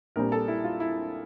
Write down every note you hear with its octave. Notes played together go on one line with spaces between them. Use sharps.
A#1 A#2 G3 C4 A#4
A4
E4
F4
E4